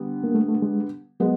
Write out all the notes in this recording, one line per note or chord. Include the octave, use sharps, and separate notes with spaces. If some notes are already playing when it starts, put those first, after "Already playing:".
Already playing: D3 G3 B3
A#3
A3
A3
G#3
F#3 G#3 B3